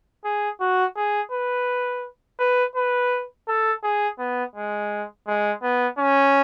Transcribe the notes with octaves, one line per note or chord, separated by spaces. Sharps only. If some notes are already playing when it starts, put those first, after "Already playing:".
G#4
F#4
G#4
B4
B4
B4
A4
G#4
B3
G#3
G#3
B3
C#4